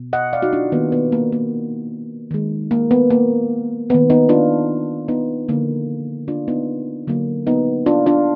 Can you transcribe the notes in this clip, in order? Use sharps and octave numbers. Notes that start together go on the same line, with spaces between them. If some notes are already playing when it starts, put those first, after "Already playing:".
Already playing: B2
D#5 F#5
D5 F5
D#4 F#4
D4 F4
D#3 A#3 B3
B3
A#3
A#3
D#3 G#3
A#3
B3
A#3
D#3 A#3 B3
B3 D#4
D4 F4
B3 D#4
D3 F3 A#3
D4 F4
B3 D#4
D3 F#3 A#3
B3 D#4
D4 F4
D4 F4